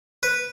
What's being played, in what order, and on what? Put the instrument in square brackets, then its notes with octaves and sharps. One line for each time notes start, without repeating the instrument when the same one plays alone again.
[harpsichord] B4